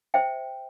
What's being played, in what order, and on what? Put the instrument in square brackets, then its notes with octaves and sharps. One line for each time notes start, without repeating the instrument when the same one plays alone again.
[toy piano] C5 E5 G5